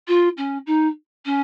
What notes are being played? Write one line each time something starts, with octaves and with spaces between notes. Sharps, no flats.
F4
C#4
D#4
C#4